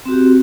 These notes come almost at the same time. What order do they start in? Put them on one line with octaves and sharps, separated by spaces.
C4 F#4 G4